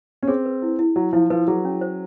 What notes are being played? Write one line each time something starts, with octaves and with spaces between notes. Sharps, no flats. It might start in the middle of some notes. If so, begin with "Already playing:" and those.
C#4
C4 G#4
B4
E4
E4
F#3 E4
F3 E4
F3 B4
F#3 G#4
C#4
C5